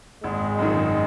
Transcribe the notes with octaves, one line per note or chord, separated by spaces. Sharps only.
G#1 G#3
F#2 D#3